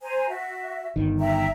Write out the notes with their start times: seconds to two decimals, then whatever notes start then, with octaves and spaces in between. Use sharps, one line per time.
0.01 C5 G#5 A#5
0.29 F#4 E5
0.96 G1 D#3
1.19 E5 G5 A#5